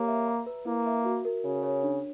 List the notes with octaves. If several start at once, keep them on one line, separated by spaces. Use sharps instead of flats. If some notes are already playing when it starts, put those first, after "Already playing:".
Already playing: A#3 G4 C#5
E5
A#5
B4
A#3 E4
E5
F#4
A#4
C#3 F#4
C#5
D4